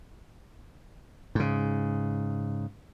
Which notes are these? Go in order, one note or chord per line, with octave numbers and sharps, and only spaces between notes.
G#2 C#3